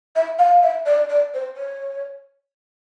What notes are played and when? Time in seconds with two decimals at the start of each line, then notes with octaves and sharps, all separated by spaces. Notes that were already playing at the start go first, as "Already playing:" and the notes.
0.15 E5
0.38 F5
0.62 E5
0.86 D5
1.09 D5
1.34 C5
1.56 C#5